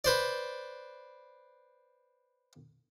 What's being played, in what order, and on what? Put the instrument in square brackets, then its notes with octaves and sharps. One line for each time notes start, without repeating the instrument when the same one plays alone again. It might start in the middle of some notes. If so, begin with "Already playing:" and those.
[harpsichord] B4 C5 D5